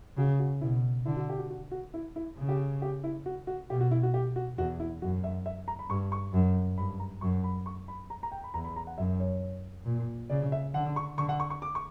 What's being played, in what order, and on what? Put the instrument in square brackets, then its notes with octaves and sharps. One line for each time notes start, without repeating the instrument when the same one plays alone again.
[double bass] C#3 [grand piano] F#4
[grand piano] F#4
[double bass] B2 [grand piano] E4
[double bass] D3 [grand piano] E4
[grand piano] F#4
G4
F#4
F#4
F#4
E4
E4
[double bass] C#3
[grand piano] G4
G4
E4
F#4
F#4
[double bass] B2 [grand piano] G4
[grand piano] F#4
E4
F#4
G4
F#4
[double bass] E2 [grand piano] F#4
[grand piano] E4
[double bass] F#2 [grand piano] F#4
[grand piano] E5
E5
A#5
B5
[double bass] G2 [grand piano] C#6
[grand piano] C#6
[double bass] F#2
[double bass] G2 [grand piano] B5
[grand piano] A#5
[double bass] F#2 [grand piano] C#6
[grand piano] B5
C#6
B5
A#5
A#5
G5
B5
[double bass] E2 [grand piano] A#5
[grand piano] B5
A#5
F#5
[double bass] F#2 [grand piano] E5
[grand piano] C#5
[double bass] A#2
[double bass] C#3 [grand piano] D5
[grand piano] E5
[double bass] D3 [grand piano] F#5
[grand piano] C#6
[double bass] D3 [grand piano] C#6
[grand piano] F#5
C#6
C#6
D6
C#6